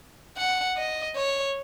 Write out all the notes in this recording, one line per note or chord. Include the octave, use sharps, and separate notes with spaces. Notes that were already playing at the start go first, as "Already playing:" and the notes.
F#5
D#5
C#5